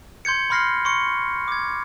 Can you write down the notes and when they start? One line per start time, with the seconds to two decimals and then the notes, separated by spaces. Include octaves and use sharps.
0.25 C6 G6 G#6 C#7
0.50 B5 C6 F6 A#6 C7
0.85 C6 C#6 C#7
1.48 D6 G#6